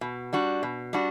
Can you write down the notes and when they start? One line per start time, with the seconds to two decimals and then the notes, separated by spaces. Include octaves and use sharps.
0.01 B2
0.33 G3 D4 F#4
0.63 B2
0.93 G3 D4 F#4